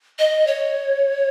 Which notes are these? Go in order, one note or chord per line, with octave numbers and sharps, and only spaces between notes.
D#5
C#5